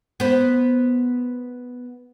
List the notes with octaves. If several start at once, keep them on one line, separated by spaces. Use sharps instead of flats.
B3 C5